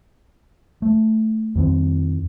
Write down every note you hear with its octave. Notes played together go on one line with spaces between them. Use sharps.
A3
F2 D#3 C4